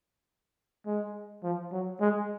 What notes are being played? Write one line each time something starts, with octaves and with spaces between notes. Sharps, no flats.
G#3
F3
F#3
G#3